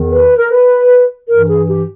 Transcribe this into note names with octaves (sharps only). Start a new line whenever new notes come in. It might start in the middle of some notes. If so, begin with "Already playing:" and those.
Already playing: E2 D#3
B4
A#4
B4
G2 E3 A#4
G#4
G4